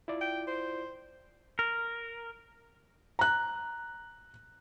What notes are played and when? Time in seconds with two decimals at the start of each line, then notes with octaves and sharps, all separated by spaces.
0.08 E4 F4 D5
0.21 G5
0.47 C5
1.59 A#4
3.19 A#5 F#6